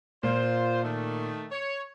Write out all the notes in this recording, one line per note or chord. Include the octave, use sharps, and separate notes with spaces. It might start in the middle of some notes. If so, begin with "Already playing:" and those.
A#2 F4 C5
D#3 A3
C#5